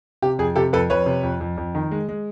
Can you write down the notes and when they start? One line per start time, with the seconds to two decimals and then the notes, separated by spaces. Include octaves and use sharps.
0.22 C3 G4
0.39 F2 G#4
0.56 C3 G4 A4
0.73 F2 A4 B4
0.90 F2 B4 C#5
1.06 C3
1.23 F2
1.41 F2
1.57 F2
1.75 D#3
1.91 G#3
2.08 G#3